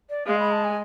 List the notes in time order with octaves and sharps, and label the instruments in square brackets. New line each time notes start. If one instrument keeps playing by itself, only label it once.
[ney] D5
[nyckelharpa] G#3 [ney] F5
[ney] B5
A5
G#5